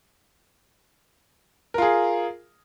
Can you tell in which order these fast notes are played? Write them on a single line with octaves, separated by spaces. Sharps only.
A#4 F4 G#4